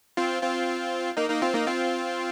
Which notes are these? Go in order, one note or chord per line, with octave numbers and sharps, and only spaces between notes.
C4 F4
C4 F4
A#3 D#4
A#3 D#4
C4 F4
A#3 D#4
C4 F4